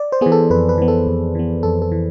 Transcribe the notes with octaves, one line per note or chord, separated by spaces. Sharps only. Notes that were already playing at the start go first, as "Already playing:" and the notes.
Already playing: D5
C5
E3 B3 G#4
A4
F2 B4
B4
E3 B3
A4
F2
E3 B3
F2 A4
A4
E3